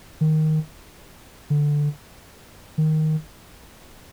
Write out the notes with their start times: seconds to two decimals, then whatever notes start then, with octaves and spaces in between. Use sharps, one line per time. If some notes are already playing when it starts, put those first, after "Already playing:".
0.21 D#3
1.50 D3
2.78 D#3